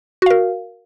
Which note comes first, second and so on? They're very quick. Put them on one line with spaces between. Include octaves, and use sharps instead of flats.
F#4 F5 A#4